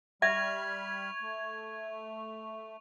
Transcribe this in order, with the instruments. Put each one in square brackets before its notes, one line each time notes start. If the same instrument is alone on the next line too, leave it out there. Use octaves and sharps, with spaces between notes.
[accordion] G3 B5 F6 [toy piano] E5 [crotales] C#6 F7 [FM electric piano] G#6
[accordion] A3